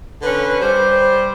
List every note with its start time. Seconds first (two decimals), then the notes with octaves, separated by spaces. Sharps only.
0.22 D3 C#4 B4
0.60 G3 C5